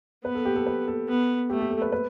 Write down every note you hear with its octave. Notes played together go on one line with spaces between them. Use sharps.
B3 B4
A4
G4
A4
B4
A4
B3
A3 G4
G4
A4
B4
B4